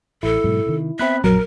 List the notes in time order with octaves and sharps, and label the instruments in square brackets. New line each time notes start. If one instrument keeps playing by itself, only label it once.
[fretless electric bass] A1 [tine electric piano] E4 [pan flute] A4
[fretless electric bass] G#2 B2 F#3
C3 D#3
[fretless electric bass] B3 [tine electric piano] C4 B5 F#6 [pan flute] E5
[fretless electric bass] A#1 F#2 [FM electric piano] F#3 [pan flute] A#4 [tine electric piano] A#5